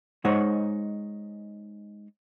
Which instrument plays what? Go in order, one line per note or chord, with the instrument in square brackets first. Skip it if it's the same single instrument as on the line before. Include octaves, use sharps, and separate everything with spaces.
[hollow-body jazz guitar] G#3 D#4 C5 C#5 D#5 F#5